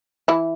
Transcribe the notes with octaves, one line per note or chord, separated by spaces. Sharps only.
E3 E4